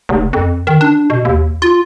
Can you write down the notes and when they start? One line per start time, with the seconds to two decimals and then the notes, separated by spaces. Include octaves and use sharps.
0.09 F1
0.33 F2
0.67 D#3
0.81 D4
1.10 B2
1.25 D#2
1.62 F4